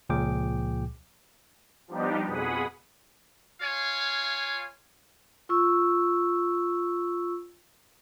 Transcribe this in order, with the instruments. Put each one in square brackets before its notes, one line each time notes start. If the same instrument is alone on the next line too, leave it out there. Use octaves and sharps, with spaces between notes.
[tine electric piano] C#2 A#2 F3 G#4 G5 D6
[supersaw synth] F3 G3 B3 D4 D#4 G4
F2 B2 G#4 F#5 B5 D#6
[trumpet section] F4 C#5 F5 G#5
[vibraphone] F4 C#6 E6